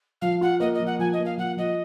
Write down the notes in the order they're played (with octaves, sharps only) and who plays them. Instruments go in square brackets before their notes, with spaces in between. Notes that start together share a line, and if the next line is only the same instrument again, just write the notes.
[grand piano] F3 [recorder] F5
[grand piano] F4 [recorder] F#5
[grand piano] A#3 [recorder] D#5
[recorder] D#5
[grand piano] F3
[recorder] F#5
[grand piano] F3 [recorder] G#5
[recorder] D#5
[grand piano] A#3
[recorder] F5
[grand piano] F3 [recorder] F#5
[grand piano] F3 [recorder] D#5